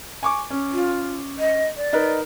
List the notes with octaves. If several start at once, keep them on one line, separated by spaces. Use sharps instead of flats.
G#5 C#6 D6
C#4
F4
D#5
D5
D#4 A#4 B4